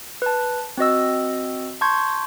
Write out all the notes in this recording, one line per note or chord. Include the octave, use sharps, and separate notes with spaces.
B4 A5
C4 F#4 D#5 E6
A5 C6 C#6 G6 G#6